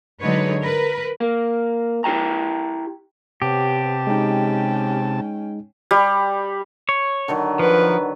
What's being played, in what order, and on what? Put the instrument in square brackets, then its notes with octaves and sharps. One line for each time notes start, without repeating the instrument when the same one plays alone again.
[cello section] D3 F#3 G#3 D#4 B4 C#5
A#4 B4
[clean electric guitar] A#3
E4 G4 G#4 G5 A#5
[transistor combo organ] C3 A5 [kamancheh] B3 C#5 [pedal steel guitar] G4
[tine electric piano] G#3 D#4 [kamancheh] C#4 G5
[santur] G3
[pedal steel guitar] C#5
[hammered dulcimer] D3 D#3 F#3
[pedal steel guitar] F3 [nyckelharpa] B4